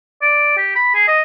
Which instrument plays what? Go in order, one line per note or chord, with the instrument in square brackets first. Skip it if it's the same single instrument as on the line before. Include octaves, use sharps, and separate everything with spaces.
[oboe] D5
G4
B5
G#4
D#5